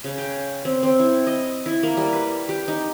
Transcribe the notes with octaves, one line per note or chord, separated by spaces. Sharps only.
C#3
G5
C4
C4
E4
D#5
E4
A#3
G3
B4
G4
D#4